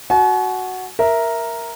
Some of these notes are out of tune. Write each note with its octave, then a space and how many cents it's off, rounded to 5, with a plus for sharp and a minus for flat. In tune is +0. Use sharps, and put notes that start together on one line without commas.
F#4 +0 G#5 +45
A#4 +0 E5 +0